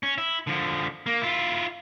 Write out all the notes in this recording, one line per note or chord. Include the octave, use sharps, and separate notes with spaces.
C#4
E4
D3 F3
A#3
E4 F4